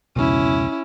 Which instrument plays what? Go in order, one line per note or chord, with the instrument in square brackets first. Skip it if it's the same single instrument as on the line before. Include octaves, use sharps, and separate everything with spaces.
[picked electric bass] F1 C#2 B2 [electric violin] C#4 E4